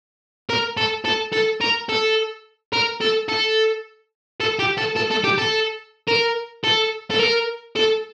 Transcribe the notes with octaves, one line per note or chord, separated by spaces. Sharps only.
A#4
A4
A4
A4
A#4
A4
A#4
A4
A4
A4
G4
A4
A4
A4
G4
A4
A#4
A4
A4
A#4
A4